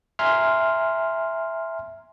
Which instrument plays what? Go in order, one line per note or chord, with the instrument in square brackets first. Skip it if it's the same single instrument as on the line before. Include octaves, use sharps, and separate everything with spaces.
[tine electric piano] E5 G#5 A#5 C6 F6